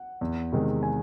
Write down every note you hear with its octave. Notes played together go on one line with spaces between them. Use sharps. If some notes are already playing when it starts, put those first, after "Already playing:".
Already playing: F#5
E2
C3 D#3 G#3
G#5